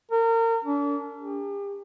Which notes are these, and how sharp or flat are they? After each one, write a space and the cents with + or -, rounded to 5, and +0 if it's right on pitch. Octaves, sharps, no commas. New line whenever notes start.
A#4 -30
D4 -40
G4 +40